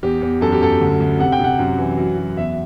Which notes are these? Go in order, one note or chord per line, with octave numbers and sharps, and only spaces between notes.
E2 G4
E2
F#2 A4
G4
F#2 A4
D2
D2
C3 F#5
G5
C3 F#5
F#2
E3
F#3
F#3
E2 E5